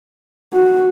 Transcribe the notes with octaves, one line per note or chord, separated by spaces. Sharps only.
F#4